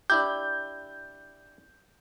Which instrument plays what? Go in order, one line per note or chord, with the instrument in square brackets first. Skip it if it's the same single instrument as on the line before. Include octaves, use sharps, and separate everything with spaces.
[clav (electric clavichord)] D4 E4 G4 [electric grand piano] G6